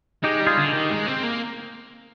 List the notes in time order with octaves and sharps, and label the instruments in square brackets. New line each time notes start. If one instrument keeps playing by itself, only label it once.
[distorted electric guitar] G#3 [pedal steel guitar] D#4 G4
[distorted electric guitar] G3
[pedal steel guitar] F4 G#4
[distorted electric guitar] D3
[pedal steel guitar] D#4 G4
[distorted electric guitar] D#3
G#3
C4
A#3